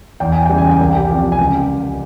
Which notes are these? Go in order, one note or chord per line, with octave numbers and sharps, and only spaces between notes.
E2 G5
G#5
C#3 E3 G3 G5
G#5
G5
C2 G#5
G4 G5
C3 F3
G#5
C#2 G4 G5